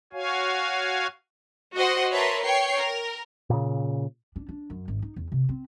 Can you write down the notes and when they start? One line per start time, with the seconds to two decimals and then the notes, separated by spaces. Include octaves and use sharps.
0.13 F#4 C#5 F5 G#5
1.76 F#4 C5 D#5 F#5
2.13 A#4 B4 C#5 E5 A5 C6
2.43 C#5 G5 C#6 C7
2.78 A#4
3.50 A#2 C#3
4.36 D4
4.49 D4
4.70 F#2
4.88 G#1
5.02 D#4
5.16 E2
5.32 C3
5.49 C4